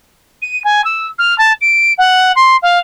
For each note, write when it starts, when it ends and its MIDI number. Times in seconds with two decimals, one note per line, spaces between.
0.42 0.62 99
0.64 0.84 80
0.84 1.07 88
1.18 1.36 89
1.38 1.53 81
1.61 1.93 98
1.98 2.32 78
2.36 2.56 84
2.62 2.78 77